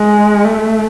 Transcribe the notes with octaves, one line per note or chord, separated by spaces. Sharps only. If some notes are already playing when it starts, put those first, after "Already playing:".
Already playing: G#3
A3